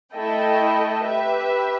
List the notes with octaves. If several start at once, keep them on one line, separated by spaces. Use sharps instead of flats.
A3 E4 A4 D#5 G5
G4 B4 E5